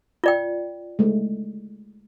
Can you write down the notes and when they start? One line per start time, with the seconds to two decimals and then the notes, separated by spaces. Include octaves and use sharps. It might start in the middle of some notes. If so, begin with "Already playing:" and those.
0.24 F4 D5 G5
0.99 G#3 A3